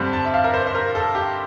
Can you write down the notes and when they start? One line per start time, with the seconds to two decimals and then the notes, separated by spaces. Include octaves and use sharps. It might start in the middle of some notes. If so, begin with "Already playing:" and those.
Already playing: G2 D3 G3 C4 A5
0.13 A5
0.25 E5
0.34 F5
0.44 A#4
0.54 C5
0.67 C5
0.75 A#4
0.95 A4
1.15 G4